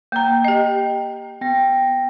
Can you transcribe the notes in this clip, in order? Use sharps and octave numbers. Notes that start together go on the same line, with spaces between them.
A#3 G5 A#5
G4 D#5
B3 G5 A#6